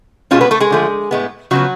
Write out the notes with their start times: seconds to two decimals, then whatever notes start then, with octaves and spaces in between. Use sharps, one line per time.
0.31 B2 F3 G#3 C#4 F4
0.41 B3 B4
0.51 A3 A4
0.60 G#3 G#4
0.71 D3 F3 A3
1.11 A2 G#3 B3
1.51 C#3 F3 F#3 B3 F#4